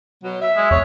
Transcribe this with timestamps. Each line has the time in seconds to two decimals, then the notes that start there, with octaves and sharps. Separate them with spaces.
0.23 B2 F#3
0.41 E5
0.56 G#3
0.71 E2 C#5